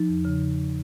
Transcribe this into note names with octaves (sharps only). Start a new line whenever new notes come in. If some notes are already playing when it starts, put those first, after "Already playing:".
Already playing: F3 D#4
E2
C#3